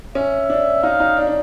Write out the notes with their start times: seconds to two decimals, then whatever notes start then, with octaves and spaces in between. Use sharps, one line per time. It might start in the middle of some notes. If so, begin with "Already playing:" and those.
0.15 C#4 E5
0.50 D4
0.83 D#4 F5
1.00 D#4
1.17 D4
1.27 D4